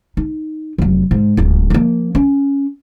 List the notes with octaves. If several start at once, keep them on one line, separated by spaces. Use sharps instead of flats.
D#4
F1 F#3
G#2
D1 C#2
F3 A#3
C#4